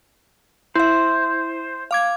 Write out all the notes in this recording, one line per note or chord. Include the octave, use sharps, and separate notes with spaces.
E4 C5 E5
F5 D6 G#6